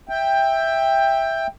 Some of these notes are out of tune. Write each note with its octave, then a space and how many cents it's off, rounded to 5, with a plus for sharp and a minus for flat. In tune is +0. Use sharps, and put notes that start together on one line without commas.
E5 +0 G5 +15